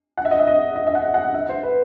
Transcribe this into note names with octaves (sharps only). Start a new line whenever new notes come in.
F#5
E5
D#5
E5
D#5
D#5
E5
F#5
F#5
E5
C5
B4